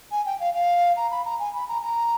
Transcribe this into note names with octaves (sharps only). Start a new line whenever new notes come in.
G#5
G5
F5
F5
A#5
B5
A#5
G#5
B5
A#5
A#5